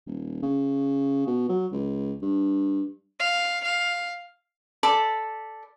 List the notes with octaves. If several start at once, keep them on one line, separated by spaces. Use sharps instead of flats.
D#1
C#3
B2
F#3
C#2
G2
F5
F5
A4 D5 B5